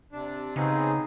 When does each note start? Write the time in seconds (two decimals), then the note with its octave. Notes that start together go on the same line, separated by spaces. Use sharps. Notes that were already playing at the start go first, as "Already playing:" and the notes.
0.13 C3 D4
0.56 C#3 B3 C4 D#4 G#4